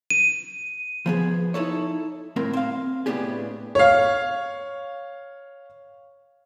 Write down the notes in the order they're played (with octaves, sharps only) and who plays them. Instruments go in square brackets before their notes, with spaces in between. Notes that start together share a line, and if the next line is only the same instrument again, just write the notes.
[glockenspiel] D#7
[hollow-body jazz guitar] F3 B3 G#4
D#4 E4 A4 C#5
A2 C4 A#4
C4 F5
A2 B3 D4 G4 G#4
[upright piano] C#5 F5